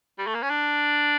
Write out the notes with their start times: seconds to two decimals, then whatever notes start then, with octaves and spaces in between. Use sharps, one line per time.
0.19 G3
0.27 A3
0.34 A#3
0.42 C#4
0.50 D4